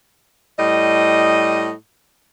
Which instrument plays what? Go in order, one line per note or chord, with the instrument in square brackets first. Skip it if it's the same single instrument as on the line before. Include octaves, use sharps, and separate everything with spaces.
[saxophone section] A2 G3 D#5